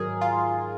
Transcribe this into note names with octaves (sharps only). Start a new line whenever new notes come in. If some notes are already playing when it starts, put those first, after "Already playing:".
Already playing: G#2 D#3 F#3 G#4 A#4
F4